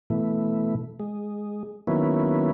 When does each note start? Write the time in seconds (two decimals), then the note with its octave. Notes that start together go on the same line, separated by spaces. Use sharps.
0.10 B2 E3 A3
1.00 G#3
1.87 D#3 F#3 A#3 B3 C#4 E4